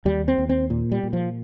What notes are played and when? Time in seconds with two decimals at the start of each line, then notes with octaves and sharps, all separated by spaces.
0.05 D#2 G3
0.28 C4
0.38 D#2
0.49 C4
0.70 A#2
0.92 G3
1.03 A#2
1.13 F3